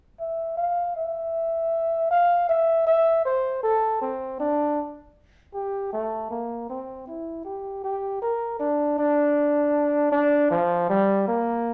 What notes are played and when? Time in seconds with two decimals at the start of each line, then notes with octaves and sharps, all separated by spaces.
0.20 E5
0.57 F5
0.96 E5
2.11 F5
2.49 E5
2.87 E5
3.25 C5
3.63 A4
4.02 C4
4.40 D4
5.54 G4
5.93 A3
6.31 A#3
6.70 C4
7.08 E4
7.45 G4
7.84 G4
8.22 A#4
8.60 D4
8.98 D4
10.12 D4
10.51 F3
10.89 G3
11.28 A#3